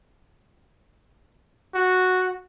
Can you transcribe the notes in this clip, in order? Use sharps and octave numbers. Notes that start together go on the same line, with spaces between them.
F#4